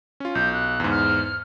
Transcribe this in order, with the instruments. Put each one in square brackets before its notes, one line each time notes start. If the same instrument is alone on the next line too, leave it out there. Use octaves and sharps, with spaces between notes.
[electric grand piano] C#4 F4
[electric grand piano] B1 [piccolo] G6
[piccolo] F#6
[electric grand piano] E2 G#2
[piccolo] F6